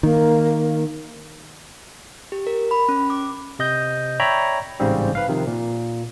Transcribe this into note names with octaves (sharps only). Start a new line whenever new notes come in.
D#3 A#3
G4
A#4
B5
C#4
D6
C3 D#5 G6
C#5 D5 E5 G5 A#5 B5
A1 G#2 C#3 G3 C4
B4 F5
C3 D#3 F3
A#2